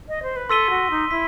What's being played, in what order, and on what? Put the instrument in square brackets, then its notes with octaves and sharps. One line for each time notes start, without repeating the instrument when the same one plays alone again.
[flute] D#5
C5
B4
[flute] A4 [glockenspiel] C6 E6 B6 D#7 G7
[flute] F#4
D#4
[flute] E4 [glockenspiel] E6 B6